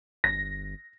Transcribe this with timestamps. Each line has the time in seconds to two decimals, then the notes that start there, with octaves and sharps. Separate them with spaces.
0.24 G1 A#6